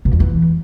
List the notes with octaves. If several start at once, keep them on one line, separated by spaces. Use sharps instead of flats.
B2
F2
E3